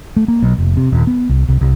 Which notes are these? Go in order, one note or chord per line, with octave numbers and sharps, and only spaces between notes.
A3
A#3
B1
F1
C3
D#1
B3
C2
C2
C2